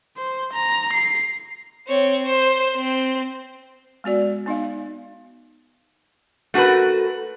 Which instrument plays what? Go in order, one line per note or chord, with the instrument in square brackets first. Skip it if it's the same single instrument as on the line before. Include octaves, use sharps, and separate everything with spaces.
[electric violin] C5
A#5
C7
[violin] C4 C#5
C5
C4
[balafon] G#3 B3 F#4 D5
B3 D#4 D#5 F5
[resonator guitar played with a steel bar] A3 F#4 G#4 A#4 B4